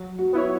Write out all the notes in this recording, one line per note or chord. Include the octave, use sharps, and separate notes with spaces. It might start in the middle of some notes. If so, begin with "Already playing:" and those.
Already playing: F#3
F#4
B3 E4 C#5